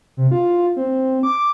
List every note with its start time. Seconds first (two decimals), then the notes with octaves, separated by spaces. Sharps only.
0.17 C3
0.31 F4
0.76 C4
1.23 D6